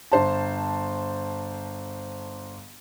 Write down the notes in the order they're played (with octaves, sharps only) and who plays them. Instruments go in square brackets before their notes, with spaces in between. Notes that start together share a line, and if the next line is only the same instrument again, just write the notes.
[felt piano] G1 C5 A5